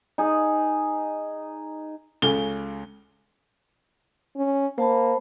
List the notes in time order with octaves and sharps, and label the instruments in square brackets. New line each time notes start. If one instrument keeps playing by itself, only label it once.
[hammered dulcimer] D#4 G#4
[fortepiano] C#2 C#3 [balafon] C#4 A4 [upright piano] G7
[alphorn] C#4
[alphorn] A#3 [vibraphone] C5 A5 B5